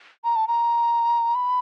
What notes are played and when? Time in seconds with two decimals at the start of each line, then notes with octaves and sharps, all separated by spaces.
0.24 A#5
0.36 A5
0.48 A#5
1.35 B5